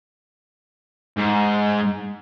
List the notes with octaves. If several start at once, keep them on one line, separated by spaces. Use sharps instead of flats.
G#2